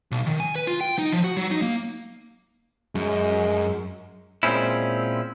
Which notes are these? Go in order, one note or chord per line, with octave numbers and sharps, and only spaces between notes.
B1
D#3
G#5
B4
F4
G5
D#4
F3
F#4
F#3
D#4
A#3
F#2 G#3
A#2 G#3 C4 C#4 E4